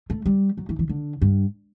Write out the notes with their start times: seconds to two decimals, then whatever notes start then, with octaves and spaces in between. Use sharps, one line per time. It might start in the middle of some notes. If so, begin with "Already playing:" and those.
0.10 A3
0.26 G3
0.57 F#3
0.69 E3
0.79 E3
0.89 D3
1.22 G2